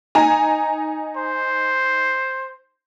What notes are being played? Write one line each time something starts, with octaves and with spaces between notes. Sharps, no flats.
D#4 G#5 A#5
C5